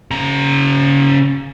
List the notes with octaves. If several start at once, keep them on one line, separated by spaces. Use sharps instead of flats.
C#3 A#5